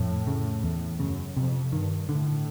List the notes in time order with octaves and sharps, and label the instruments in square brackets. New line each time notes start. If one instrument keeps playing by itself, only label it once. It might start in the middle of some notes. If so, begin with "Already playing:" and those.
Already playing: [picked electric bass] F2 [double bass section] A2
[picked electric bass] C#3
[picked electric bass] E2 [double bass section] A2
[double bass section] F#2 [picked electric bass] C#3
[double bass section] F2 [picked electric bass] C3
[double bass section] G2 [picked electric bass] D#3
[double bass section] A2 [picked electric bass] D3